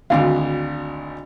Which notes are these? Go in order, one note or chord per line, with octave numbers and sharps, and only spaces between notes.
G#1 D2 D4 D#4 F5